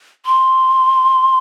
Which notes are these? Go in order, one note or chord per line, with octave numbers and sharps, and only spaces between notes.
C6